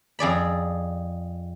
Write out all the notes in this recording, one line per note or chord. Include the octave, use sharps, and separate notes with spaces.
F2 G#4 D5 B5